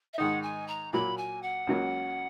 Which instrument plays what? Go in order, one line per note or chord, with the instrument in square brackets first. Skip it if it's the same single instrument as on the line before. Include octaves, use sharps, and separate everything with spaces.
[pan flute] E5
[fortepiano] G#2 D#3 G#3 D#4 [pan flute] F#5
[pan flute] G#5
A#5
[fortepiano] A#2 F#3 A#3 [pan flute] B5
[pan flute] G#5
F#5
[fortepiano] C#2 C#3 F#3 A#3